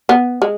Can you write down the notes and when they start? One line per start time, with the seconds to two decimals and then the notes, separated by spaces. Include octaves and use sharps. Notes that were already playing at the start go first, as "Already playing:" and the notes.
0.09 B3
0.42 G#3